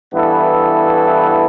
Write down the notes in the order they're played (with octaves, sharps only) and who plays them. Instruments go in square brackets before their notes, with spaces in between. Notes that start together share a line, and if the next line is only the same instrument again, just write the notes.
[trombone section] G2 E3 B3 E4 A4